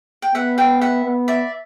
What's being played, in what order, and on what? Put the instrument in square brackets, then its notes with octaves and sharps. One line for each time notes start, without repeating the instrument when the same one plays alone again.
[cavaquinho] G5
[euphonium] B3 [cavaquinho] E5 F#5
[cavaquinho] F5 G5
E5 F#5
[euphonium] B3
[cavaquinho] D5 E5